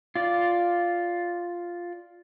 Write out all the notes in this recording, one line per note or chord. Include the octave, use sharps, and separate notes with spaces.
F4 D5